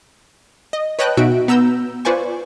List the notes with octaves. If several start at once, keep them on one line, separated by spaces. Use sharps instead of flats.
D#5
B4 C#5 D#5 G5 A5 F#6
B2 D#4 F#4 E5 D7
B3 A#5 E6 G6
F4 B4 C5 D5 G#5 C#6